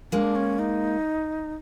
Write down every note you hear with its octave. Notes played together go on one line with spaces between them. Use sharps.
G#3 A#3 D4
C#4
D#4